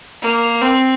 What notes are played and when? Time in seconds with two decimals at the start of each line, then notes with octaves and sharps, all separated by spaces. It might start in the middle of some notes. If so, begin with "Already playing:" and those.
0.22 A#3
0.62 C4